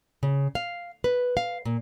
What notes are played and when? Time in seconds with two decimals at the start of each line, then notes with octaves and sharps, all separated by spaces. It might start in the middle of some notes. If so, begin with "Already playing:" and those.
0.23 C#3
0.55 F5
1.04 B4
1.37 F5
1.65 A#2